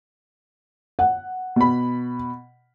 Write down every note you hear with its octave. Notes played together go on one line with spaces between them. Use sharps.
F#5
B2 B5